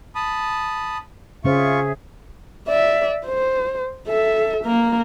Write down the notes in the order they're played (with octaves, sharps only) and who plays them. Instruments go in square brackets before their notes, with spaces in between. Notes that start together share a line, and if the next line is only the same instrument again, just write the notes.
[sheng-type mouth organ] A5 B5 D#6
[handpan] C#3 C#4 C5 [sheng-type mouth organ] F4 C#6 [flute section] G#4 E5
[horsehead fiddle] D5 E5
C5
A4 E5
A#3 A#4